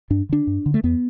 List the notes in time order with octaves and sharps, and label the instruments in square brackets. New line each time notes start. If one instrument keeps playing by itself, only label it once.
[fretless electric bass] G2 D4
D3 D4
G2
D3
A3
E2 B3